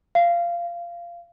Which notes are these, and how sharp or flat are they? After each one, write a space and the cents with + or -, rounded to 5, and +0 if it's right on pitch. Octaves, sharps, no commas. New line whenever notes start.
F5 -20